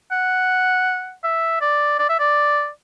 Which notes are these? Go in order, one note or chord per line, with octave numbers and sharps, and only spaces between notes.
F#5
E5
D5
D5
E5
D5